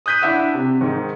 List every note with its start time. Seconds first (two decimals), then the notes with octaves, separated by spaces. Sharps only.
0.06 D#6 F#6 G6 B6 D#7
0.22 D4 E4 E5 F#5
0.54 C3
0.81 G#2 D#3